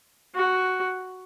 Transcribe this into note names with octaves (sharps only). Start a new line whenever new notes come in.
F#4